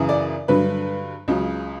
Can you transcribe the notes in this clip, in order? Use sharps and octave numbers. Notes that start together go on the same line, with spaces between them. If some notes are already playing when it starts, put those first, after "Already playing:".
Already playing: F#2 C#3 E3
D5
G2 D3 F#3 B4
C#2 C#3 F#3